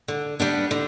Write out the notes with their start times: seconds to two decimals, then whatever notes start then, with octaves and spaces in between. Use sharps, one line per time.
0.08 D3
0.40 G3 B3 D4
0.71 D3